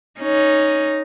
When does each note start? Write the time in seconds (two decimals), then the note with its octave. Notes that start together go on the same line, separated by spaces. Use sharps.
0.20 C#4 D#4